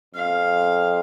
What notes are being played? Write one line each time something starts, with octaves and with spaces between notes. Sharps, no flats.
F2 F5